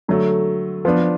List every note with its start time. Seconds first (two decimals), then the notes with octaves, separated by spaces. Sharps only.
0.08 D3 F#3 A3
0.85 F3 B3 D4